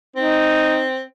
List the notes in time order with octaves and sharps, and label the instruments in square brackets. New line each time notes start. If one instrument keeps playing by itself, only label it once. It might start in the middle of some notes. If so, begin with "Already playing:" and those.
[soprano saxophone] C4 [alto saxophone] D#4